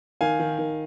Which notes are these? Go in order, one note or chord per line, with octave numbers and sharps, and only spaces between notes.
D#3 F5 G#5
D#3
D#3